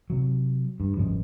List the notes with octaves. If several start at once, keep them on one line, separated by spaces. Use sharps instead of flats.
C3 F#3
G2
G1 G#2 C#3 F3